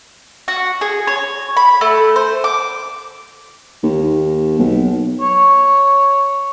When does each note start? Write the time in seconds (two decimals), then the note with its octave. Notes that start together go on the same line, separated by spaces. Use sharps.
0.48 F#4
0.81 G#4
1.07 C#5
1.57 B5
1.81 A3
2.16 C5
2.44 D6
3.83 D#2
4.59 B1
5.21 C#5